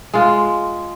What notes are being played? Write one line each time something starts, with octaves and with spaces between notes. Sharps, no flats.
G#3 F4